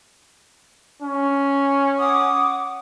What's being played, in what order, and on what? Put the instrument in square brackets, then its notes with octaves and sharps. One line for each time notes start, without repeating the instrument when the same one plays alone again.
[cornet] C#4
[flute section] F#5 D6 D#6